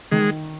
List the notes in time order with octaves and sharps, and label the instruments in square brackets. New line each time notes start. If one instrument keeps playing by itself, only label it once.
[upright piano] D#3 [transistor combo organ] G#3